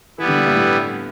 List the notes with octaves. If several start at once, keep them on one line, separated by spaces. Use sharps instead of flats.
E3 G3 B3 E4
D3
B2
G2
A2